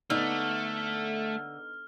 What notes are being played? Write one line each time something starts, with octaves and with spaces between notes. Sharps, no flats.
D3 A3 B3 D#4 F6